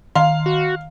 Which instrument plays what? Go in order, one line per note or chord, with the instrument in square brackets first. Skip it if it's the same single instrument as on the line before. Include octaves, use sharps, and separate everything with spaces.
[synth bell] D#3 C6 [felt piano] F5
[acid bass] F#4